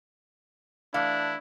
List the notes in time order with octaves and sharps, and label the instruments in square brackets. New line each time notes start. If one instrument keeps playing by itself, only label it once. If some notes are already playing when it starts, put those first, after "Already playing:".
[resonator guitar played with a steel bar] E3 A3 F5 [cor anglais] D4 [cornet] E4